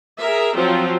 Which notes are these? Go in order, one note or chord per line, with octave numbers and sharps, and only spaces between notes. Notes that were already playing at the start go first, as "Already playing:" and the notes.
G#4 A#4 E5
F3 F#3 C4 F4